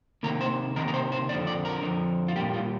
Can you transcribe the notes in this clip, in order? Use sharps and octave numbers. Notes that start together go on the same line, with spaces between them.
C3 D#3 A#3 A#4
C5
C3 D#3 A#3 A#4
A#4
C5
C5
F2 D3 F3 D5
D5
A#4
F2 D3 F3
F4
A#2 G3 A#3 G4
F4